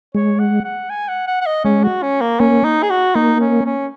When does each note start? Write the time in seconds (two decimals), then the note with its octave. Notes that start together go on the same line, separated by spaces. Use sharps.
0.15 G#3 C#5
0.39 F#5
0.64 F#5
0.90 G#5
1.08 F#5
1.27 F#5
1.41 F#5
1.46 D#5
1.64 G#3 C#4
1.83 F#4
2.03 C#4
2.21 A#3
2.40 A#3 C#4
2.65 D#4
2.83 G#4
2.90 F#4
3.15 A#3 D#4
3.40 C#4
3.65 C#4